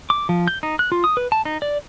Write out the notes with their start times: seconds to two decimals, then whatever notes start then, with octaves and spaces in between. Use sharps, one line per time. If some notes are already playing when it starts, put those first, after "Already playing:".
0.10 D6
0.29 F3
0.48 G6
0.63 D#4
0.79 F#6
0.92 F4
1.04 D#6
1.17 B4
1.32 A5
1.45 D#4
1.62 D5